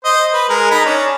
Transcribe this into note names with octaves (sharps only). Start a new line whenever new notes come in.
C5 D#5
B4
G#3 A#4
D#4 A#5 B5
C#4 D4